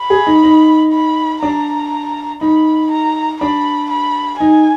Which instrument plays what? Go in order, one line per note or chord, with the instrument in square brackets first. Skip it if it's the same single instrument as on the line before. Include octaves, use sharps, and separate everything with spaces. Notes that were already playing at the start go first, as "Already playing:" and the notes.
Already playing: [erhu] B5
[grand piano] G#4
D#4
D#4
[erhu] B5
[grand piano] D4 [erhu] A#5
[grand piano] D#4 [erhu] B5
[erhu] A#5
[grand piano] D4 [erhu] B5
[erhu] B5
[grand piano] D#4 [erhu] G#5